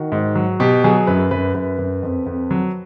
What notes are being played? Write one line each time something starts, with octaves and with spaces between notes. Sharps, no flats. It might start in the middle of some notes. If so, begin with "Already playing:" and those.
Already playing: D#3 F#4
G#2
F#3
B2 G4
F#3 G#4
F#2 B4
F#2 B4
F#2 B4
F#2
F2
F2
F#3